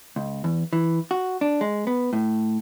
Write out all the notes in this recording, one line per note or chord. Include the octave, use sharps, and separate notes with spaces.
C#2
E2
E3
F#4
D4
G#3
B3
A2